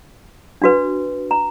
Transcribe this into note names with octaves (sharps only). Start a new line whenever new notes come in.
D4 F#4 B4
A#5